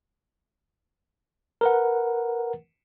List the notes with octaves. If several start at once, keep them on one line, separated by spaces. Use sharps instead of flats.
A#4 B4 F#5